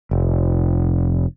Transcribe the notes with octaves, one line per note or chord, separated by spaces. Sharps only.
F1